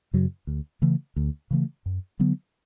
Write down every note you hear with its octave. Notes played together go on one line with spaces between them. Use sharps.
F#2 C#3 F#3
D2
C#3 E3 A3
D2
C#3 E3 A3
F#2
D3 F#3 B3